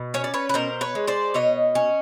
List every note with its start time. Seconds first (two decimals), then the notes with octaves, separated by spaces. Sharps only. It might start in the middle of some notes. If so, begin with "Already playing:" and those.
Already playing: B2
0.14 C#4 C#5
0.24 D5
0.34 B4 C#5
0.49 B4
0.54 B2 A#4 C5
0.81 B4 C#5
0.95 G#3
1.07 C5 D5
1.34 B2 C#5 D#5
1.75 C#4